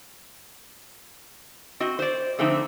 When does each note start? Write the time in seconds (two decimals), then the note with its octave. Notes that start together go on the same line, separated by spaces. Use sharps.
1.80 C4 F#4 D#5
1.99 C5 D5
2.39 D3 F3 A3 C4 D#4